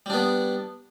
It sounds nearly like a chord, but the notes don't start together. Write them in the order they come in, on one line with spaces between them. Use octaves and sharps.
G3 D4 B3